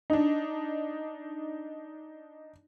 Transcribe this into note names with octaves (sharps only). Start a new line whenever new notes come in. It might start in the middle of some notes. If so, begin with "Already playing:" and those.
D4 D#4